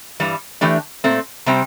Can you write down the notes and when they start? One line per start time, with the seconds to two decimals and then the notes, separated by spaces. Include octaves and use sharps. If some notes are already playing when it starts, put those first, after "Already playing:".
0.20 G2 E3 G3
0.61 E3 A3 D4 G4
1.04 A#2 A3 C4
1.46 C3 G3 C4 G4